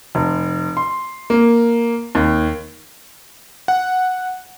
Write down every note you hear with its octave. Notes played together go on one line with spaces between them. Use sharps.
F1
C6
A#3
D#2
F#5